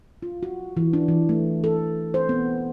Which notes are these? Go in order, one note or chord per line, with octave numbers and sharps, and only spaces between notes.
F4
F#4
E3
D4
E3
A3
A4
C5
B3